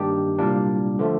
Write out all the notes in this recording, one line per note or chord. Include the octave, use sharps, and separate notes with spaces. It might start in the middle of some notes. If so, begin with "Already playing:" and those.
Already playing: G2 D#3 A#3 D4 G4
C2 A#2 G3 A#3 D4
D3 F3 A3